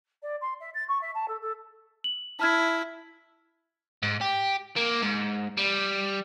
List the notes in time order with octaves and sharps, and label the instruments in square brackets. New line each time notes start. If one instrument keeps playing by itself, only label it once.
[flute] D5
C6
E5
A6
C#6
E5
A5
A4
A4
[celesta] F#7
[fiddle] E4 [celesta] A5 F6 G#6
[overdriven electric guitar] G#2
G4
A#3
G#2
G3